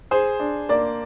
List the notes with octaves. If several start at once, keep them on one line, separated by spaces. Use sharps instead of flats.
G#4 C5
D4
A#3 D5